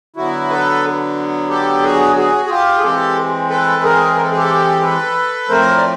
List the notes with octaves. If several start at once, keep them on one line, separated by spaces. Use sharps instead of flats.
D3 F#3 B3 E4 F#4
A4 B4
G4 A4
F#4 G#4
F#4 G#4
G#4
F4 G4
G#4
E3 G#3 C4 G4 A4
A4 B4
G#4 A#4
A#4
A4
G#4
G4 A4
A4 B4
A2 F3 A3 C4 A#4 C5
D5